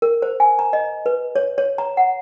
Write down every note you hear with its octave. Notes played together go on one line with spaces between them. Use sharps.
A#4
C5
G#5
A#5
D#5
B4
C#5
C#5
A#5
F#5